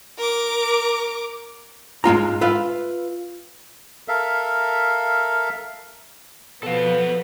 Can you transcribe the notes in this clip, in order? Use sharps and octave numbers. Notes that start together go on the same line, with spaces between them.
A#4 D6
G#2 G#3 F4 A#5
F4 B4 E5 F5
A4 A#4 E5 F5
B2 F3 B3 A4 F5